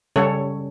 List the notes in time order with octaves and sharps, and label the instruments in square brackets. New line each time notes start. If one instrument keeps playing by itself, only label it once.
[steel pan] C#3 G3 C#4 A4 C#5